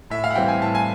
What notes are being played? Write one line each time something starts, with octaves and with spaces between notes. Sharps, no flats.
A2 E5
F5
F#5
E3 G3 C4 G5
G#5
A2 A5
G#5